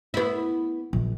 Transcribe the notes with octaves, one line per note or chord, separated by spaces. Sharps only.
B3 E4
A#1